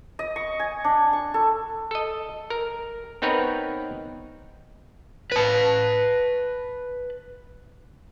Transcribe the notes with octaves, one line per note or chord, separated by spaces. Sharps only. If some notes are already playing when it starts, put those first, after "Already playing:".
D#5
C#6
G#5
D4
C#6
A4
A4 D#5
A#4
B3 C4 D#4 A#4 B4 C#5
B4 A5